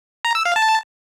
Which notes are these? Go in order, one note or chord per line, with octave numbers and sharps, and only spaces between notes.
A#5
E6
F5
A5